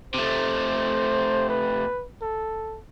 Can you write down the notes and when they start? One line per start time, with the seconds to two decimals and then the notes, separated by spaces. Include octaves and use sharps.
0.14 C3 A3 C5
1.49 B4
2.21 A4